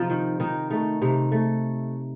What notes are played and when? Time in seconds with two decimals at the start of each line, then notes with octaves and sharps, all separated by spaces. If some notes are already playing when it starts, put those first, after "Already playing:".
Already playing: C3 F3 D#4 F4
0.10 D#3
0.40 D#3 D#4
0.70 A3 D#4
1.01 C3 D#4
1.32 A3